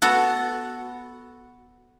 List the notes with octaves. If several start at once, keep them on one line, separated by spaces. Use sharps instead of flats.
B3 F#4 A4 F#5